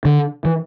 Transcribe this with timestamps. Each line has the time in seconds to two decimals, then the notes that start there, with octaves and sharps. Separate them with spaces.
0.05 D3
0.45 E3